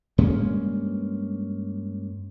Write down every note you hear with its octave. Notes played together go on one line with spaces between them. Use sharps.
G2 G#3 A#3 C#4